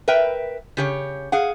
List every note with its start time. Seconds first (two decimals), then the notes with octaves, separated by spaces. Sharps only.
0.08 A#4 B4 E5 G5
0.77 C#3 G4 C#5
1.32 G#4 F5 F#5